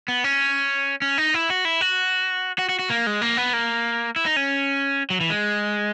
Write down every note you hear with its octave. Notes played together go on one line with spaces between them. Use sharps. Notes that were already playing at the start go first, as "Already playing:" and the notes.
B3
C#4
C#4
D#4
E4
F#4
E4
F#4
F#4
F#4
F#4
A#3
G#3
A#3
B3
A#3
E4
D#4
C#4
F#3
E3
G#3